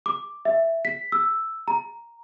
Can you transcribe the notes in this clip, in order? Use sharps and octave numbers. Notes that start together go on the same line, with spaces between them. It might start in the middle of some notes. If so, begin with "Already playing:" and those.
D6
E5
B6
E6
A#5